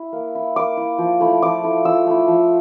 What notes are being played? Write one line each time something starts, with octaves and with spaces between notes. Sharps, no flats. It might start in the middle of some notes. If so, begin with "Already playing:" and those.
Already playing: E4
A#3
E4
A#3 D6
E4
F3
A3 E4
F3 D6
A3 E4
F3 E6
A3 E4
F3